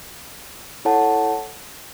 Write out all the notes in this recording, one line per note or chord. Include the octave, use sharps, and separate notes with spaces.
E4 A4 C#5 F#5 A5